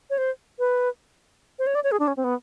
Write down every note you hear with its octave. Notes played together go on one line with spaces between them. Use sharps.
C#5
C5
B4
C5
C#5
D5
C#5
G#4
D4
C#4
C4
B3